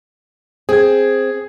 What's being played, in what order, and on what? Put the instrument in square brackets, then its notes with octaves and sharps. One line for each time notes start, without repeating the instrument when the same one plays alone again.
[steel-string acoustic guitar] C4 [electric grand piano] G#4 G#6